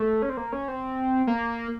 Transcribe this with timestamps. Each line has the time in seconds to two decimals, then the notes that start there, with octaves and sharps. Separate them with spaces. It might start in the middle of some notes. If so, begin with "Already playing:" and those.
Already playing: A3
0.22 C#4
0.30 C4
0.37 A#3
0.52 C#4
0.68 C4
1.27 A#3